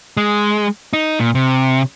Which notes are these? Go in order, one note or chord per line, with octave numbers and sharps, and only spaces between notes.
G#3
D#4
A#2
C3